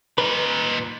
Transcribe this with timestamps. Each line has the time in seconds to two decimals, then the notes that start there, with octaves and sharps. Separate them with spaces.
0.18 A#2 D#4 B4